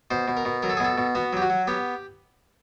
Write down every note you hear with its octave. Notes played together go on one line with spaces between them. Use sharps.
B2 C5
B2
A#4
B2
F#3 A#4
A4
G#4
B2 A4
B2
B3 F#4
F#3 G4
F#4
F#3
B3 G4